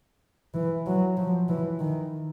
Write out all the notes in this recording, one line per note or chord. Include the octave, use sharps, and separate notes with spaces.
E3
F#3
F3
E3
D#3